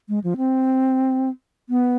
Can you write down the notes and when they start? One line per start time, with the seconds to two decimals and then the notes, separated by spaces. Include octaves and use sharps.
0.09 G#3
0.24 F3
0.37 C4
1.69 B3